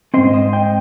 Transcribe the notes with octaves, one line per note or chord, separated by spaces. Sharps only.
G#2 G3 C4 C5 D#5
C5 D#5
D#5 G5